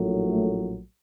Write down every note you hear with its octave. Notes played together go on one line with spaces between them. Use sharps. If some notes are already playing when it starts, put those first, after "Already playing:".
Already playing: A#1 A2 F#3
A3